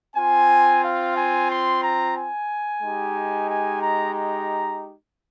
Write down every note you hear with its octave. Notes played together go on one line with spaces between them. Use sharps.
C4 F4 G#5
F5
G#5
C6
A#5
G#5
G#3 D#4 G4
G#5
A#5
A#5